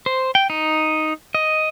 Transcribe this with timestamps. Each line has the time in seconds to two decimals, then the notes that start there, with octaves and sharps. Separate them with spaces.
0.06 C5
0.35 G5
0.50 D#4
1.35 D#5